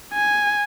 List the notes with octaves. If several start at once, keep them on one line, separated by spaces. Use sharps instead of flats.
G#5